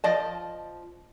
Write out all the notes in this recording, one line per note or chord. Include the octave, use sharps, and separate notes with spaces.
F3 D5 D#5 A5